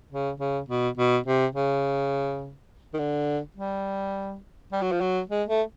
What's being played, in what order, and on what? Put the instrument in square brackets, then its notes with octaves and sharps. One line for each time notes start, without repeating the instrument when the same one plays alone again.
[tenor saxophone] C#3
C#3
B2
B2
C3
C#3
D#3
D3
G3
G3
F#3
F3
F#3
G#3
A3